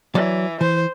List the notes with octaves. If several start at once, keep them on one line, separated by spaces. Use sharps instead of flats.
E3 F#3 D5
E3 C5